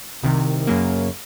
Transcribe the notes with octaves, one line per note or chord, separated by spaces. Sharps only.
C2 C3 D#3
F#2 C#3 F#3 A#3